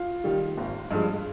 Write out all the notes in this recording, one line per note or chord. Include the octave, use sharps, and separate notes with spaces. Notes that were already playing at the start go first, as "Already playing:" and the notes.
Already playing: F4
D#3 G3
G#1
G2 F3 G#3